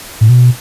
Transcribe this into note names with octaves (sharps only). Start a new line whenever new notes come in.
A2
B2